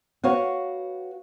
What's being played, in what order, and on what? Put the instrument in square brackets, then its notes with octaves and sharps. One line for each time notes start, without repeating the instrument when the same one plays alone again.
[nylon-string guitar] F#4 B4 C#5 F5 F#5